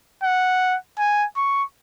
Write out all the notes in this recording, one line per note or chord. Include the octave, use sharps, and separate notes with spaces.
F#5
G#5
C#6